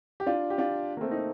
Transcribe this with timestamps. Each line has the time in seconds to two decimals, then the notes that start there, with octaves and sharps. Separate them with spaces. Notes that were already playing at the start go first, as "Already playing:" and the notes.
0.20 G4
0.26 D4 F4
0.50 G4
0.58 D4 F4
0.97 A#3
1.01 A3 C4
1.11 C4 D#4